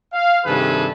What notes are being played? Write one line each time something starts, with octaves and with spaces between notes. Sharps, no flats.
F5
G2 C3 D#3 G#4 A4 B4